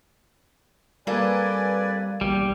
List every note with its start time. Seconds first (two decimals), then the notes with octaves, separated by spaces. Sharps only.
1.07 G3 A#3 C4 A4 B4 D5 G#5
2.21 B1 E2 G3 A#3